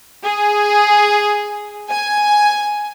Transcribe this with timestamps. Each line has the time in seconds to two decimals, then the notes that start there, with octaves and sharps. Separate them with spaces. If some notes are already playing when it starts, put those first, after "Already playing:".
0.24 G#4
1.90 G#5